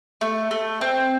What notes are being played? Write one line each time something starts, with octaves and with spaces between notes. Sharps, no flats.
A3
A3
C4